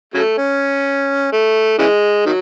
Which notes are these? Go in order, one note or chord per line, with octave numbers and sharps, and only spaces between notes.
C#3 F#3 A3
C#4
A3
C#3 E3 G#3
D#3 F#3